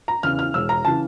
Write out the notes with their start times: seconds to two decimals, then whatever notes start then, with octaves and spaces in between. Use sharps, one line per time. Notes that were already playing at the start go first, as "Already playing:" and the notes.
0.08 A#5
0.23 E2 C#3 E3 F6
0.39 F6
0.54 E1 E6
0.69 A#5
0.85 C#3 E3 A5